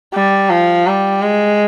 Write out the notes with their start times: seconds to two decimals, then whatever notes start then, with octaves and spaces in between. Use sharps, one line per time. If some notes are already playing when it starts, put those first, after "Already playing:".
0.14 G3
0.50 F3
0.87 G3
1.22 G#3